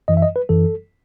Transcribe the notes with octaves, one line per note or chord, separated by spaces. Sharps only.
F#2 E3 D#5
E5
D#5
B4
F#2 E3 A4